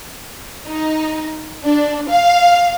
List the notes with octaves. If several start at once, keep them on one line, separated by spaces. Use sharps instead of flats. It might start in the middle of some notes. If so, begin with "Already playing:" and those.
D#4
D4
F5